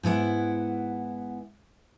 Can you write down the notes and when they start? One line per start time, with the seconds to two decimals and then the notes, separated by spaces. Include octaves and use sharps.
0.03 G#2 B3 E4 F#5